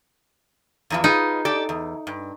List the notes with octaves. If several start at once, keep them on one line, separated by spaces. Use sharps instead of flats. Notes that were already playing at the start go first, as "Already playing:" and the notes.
E2 E3 F3
D#4 F4 G#4 B4
G4 A4 D5
E2
G2